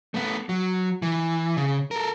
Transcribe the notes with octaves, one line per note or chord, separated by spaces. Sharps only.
A3 B3
F#3
E3
C#3
A4 A#4